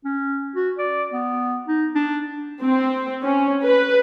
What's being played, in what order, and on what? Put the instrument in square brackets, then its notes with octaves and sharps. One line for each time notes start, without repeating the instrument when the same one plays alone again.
[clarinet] C#4
F#4
D5
B3
D#4
D4
[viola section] C4
C#4
B4